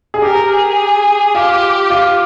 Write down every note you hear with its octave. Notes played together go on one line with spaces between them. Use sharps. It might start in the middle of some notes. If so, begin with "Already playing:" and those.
G#4
G4 A#4
G#4
F4 G4
F4